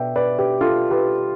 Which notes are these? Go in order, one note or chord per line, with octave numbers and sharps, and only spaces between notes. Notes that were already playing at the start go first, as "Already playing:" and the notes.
Already playing: B2 D5 E5 G5
B4 D5
G4 B4
F4 A4
G4 B4